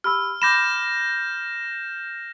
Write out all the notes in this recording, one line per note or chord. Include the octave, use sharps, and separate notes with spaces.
G4 B5 E6 F6
B5 D6 G6 A#6 E7